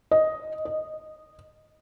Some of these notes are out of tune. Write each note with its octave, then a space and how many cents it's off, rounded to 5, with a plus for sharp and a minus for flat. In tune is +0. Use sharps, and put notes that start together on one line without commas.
D#5 +5
D#5 -10